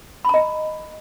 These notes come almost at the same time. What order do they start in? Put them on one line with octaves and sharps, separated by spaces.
B5 A#5 D#5